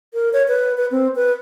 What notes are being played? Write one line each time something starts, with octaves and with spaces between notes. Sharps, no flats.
A#4
C#5
B4
B4
C4
B4